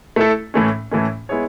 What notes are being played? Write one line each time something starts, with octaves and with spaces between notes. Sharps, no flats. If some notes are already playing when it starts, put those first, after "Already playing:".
A3 E4 A4
A2 E3 A3 C#4
A2 E3 A3 C#4
G#3 B3 E4 G#4 C#5